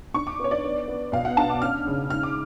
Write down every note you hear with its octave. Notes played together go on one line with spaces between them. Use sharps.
D4 C#6
D6
B3 C#5
D5
B3
B3
B2 F5
F#5
D4 A5
D6
C#4 F6
C#3
G#2 F6
D6